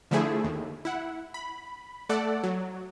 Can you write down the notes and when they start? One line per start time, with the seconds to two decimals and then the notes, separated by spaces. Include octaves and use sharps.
0.11 D3 F3 A3 E4 G#4
0.44 D#2
0.85 E4 F#5
1.34 B5
2.09 A3 A4 D5 F#5
2.44 F#3